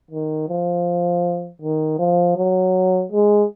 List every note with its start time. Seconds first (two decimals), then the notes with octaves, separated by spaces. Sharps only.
0.11 D#3
0.49 F3
1.62 D#3
1.99 F3
2.36 F#3
3.12 G#3